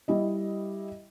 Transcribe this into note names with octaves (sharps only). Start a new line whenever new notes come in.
G3 E4 D#5